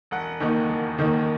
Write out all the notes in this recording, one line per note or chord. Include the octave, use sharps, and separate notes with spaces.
E1 F#5
D#2 D#3 A#3 D#4
E1
D#2 D#3 A#3 D#4